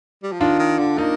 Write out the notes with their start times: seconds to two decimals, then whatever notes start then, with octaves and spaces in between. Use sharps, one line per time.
0.24 G3
0.32 F3
0.40 D#3 D4 F4
0.59 D#3
0.79 D3
0.98 A#3 D#4